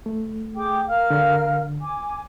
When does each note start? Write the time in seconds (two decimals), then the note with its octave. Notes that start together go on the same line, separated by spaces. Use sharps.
0.06 A3
0.56 G#4 G5 D6
0.88 A#4 F5 F6
1.10 D3
1.80 G#5 D6